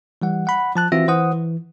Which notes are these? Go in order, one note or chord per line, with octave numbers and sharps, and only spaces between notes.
E3 G3 F#5
F#5 B5
F3 A5 F#6
E3 C4 F4 F#4 E5 A#6
E3 C5 F#5 D#6
E3